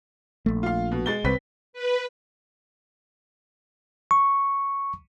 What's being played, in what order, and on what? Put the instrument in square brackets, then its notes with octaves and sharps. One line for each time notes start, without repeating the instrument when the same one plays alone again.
[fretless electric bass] A#1 A3
[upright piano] F4 F5
B2
G#3 A6 G7
[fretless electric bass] C2 [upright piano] C4 B4 B6
[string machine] B4
[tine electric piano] C#6